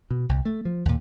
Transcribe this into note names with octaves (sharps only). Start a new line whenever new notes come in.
B2
C2
A3
F3
D#2 A#2